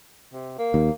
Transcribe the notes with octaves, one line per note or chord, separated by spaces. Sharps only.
C3
A#3
D#2